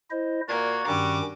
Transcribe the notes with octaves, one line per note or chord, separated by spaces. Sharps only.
E4 C5 D#5
A#2 A#3 F#4 D5 G#6
G2 D#3 G3 C#4 D6